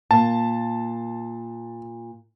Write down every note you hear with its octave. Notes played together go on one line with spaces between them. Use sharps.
A#2 A5